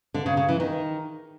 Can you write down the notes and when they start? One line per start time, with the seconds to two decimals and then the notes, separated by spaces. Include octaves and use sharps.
0.14 D3
0.26 C#3
0.37 C#3
0.48 E3
0.60 D#3